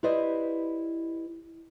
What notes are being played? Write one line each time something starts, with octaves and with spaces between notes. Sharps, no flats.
E4 G4 B4 C5 D5 D#5